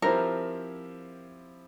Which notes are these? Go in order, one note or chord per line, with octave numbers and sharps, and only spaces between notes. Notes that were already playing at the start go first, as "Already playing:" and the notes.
F3 C4 E4 G4 A#4 C5